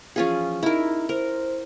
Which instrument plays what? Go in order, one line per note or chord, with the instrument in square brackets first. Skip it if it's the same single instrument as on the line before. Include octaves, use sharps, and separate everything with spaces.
[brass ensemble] E3 F3 [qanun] C#4 F4 G#4
[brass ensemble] D#4 [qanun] E4 A#4
[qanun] A#4 [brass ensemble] C5